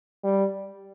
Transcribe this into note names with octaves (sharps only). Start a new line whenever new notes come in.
G3